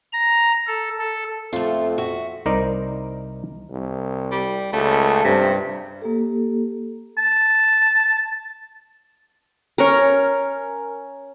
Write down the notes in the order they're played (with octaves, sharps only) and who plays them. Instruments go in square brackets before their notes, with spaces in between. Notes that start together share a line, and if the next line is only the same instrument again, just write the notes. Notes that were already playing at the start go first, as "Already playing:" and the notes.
[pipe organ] A#5
A4
A4
[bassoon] F2 [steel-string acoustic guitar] A3 F4
[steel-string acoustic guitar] F#4 E5
[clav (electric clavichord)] C2 D#4 A#4 C5 D5
[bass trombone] C2
[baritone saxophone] G3
[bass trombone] C#2 [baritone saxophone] A3
[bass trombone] G2 [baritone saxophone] C3
[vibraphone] A#3 G4 A4
[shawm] A5
[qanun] C#4 A#4